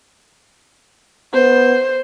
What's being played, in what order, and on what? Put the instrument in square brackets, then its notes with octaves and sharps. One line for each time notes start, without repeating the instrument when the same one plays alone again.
[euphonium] B3 [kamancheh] C5